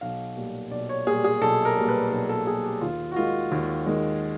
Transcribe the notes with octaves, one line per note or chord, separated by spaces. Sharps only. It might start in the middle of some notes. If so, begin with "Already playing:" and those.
B1 F5
A#2 G3
B1 D5
C#5
A#2 G3 G#4
G#4
B1 A4
A#4
A#2 G3
B4
B1 A#4
A4
A#2 G3 G#4
G4
D#2 F4
F#4
D#3 G#3 F4
D#2
D#3 G#3